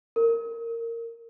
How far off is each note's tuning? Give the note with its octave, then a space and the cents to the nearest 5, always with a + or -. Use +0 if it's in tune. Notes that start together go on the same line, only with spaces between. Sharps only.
A#4 -15